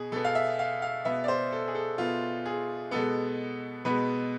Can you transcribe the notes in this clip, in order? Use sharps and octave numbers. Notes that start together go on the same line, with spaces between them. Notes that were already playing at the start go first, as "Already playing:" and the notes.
Already playing: B2 G#4
B2 B3 A4
F5
E5
F5
F5
B2 B3 E5
D5
C5
A4
G#4
A4
B2 B3 F4
G#4
B2 G#3 B3 A4
B2 G#3 B3 B4